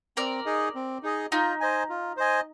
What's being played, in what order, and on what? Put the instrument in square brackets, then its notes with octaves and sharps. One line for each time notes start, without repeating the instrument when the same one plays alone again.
[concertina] C4 [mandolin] A#4 D5
[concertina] D#4 G#4 D#5
C4
D#4 G#4 D#5
[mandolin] D#4 [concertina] F4
[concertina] C5 D#5 G#5
F4
C5 D#5 G#5